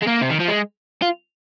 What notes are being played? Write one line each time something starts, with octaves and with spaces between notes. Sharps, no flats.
G#3
A#3
C3
D#3
F3
G#3
F4